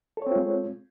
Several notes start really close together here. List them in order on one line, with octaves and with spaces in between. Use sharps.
A4 C#5 C4 F4 G#3